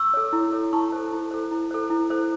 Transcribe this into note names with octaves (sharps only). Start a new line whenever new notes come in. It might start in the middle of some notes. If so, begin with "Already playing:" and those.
Already playing: C#6 E6
A4 C#5
E4
A4 C#5
E4 A5 C#6
A4 C5
E4
A4 C5
E4
A4 C5
E4
A4 C5